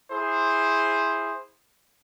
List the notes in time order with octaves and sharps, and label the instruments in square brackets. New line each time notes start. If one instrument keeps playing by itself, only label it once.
[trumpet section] E4 G#4 C5